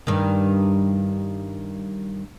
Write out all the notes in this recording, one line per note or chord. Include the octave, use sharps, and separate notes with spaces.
G2 D#3